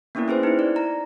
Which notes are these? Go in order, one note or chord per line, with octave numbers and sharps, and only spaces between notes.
A#3 B3 C#4 D4 E4 A#4
C#4 G#4 B4 C5
D#4 E4
D5
A#5